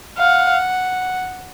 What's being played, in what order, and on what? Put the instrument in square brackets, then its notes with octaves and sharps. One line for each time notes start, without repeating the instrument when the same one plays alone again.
[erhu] F5 [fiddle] F#5